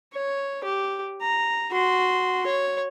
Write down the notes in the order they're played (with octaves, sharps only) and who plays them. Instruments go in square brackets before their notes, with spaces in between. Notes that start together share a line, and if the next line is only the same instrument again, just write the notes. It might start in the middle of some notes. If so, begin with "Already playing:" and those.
[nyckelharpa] C#5
G4
A#5
F#4 C6
C#5